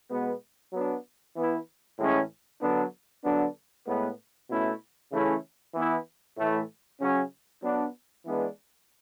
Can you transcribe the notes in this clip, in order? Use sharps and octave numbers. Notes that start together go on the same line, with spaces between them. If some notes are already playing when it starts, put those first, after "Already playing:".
B2 G#3 B3
F#3 B3 D4
E3 B3 E4
A2 E3 G#3 C#4
D3 F#3 B3 D4
D3 F#3 B3 D4
A2 G#3 B3
B2 A3 C#4 E4
C#3 E3 A3 C#4 E4
E3 B3 E4
A2 E3 A3
C#3 F#3 C#4
F#3 B3 D4
E3 G#3 B3 D4